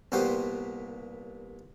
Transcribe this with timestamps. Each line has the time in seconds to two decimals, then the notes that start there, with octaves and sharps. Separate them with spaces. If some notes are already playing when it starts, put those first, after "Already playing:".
0.12 C2 A#2 B3 F#4 G4 C5